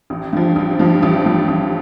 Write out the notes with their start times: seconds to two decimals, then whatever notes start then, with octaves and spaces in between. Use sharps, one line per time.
0.10 A1
0.33 G2 F3
0.56 A1
0.79 G2 F3
1.03 A1
1.25 G2 F3
1.48 A1